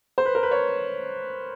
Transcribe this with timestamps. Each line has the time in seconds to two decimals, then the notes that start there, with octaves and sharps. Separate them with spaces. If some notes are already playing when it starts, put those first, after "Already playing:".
0.18 C5
0.25 B4
0.35 A#4
0.43 B4
0.51 C#5